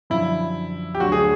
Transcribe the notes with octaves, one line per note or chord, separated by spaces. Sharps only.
F#2 D3 F3 E4
G4
D2 D3 F#3 F#4
G#4